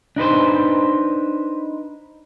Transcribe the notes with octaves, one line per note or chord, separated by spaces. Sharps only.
D4 D#4 B4 C5